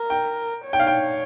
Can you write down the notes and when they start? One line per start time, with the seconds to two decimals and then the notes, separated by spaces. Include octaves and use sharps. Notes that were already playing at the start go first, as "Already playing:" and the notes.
Already playing: A#4
0.10 G5
0.65 C#5
0.73 G5
0.80 F5
0.87 G5